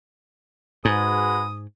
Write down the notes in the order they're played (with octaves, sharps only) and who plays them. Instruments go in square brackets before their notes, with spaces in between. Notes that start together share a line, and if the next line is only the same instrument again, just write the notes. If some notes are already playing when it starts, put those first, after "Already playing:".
[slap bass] G#2 [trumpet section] G#3 F#4 B4 [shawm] D#6